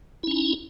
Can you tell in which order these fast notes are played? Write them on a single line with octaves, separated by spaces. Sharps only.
E4 C#4 D#4